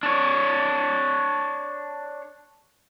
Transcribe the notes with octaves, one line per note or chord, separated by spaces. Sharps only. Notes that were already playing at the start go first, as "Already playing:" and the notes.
D4 C#5